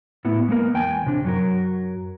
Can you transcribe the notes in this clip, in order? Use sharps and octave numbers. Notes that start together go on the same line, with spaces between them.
A2 B3 E4
G#3 A#3 B3 A#4
E2 G5 G#5
C3 D4
F#2 F#3 A#4